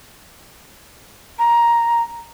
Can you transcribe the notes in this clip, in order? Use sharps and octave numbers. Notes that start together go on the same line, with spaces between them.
A#5